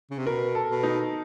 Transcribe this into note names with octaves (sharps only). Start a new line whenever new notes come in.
C#3
C3
B2 A#4
A4
B2
D#4